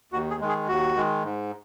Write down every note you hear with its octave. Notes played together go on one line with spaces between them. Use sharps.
D#2 F#4
G#4
D#3 G#3
G#4
D#2 F#4
D#3 G#3
G#2